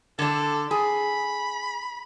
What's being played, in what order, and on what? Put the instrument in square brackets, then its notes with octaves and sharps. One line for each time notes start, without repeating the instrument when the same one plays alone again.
[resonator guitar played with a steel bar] D3 D4 [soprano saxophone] A4
[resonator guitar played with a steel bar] G#4 [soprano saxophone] B5